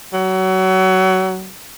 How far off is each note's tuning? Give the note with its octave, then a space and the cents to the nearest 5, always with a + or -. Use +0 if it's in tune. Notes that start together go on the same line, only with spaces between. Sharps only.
F#3 +25